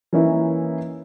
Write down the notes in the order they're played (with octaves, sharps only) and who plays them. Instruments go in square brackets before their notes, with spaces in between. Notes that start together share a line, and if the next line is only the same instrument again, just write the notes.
[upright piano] E3 A#3 C#4 D#4 E4